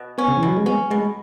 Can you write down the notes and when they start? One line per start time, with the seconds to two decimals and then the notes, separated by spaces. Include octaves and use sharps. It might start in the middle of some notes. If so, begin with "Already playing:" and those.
Already playing: B2
0.18 B3 C#4
0.28 C#3
0.37 E3
0.43 B2 F#3
0.57 G#3
0.66 B3 C#4
0.91 B2 G#3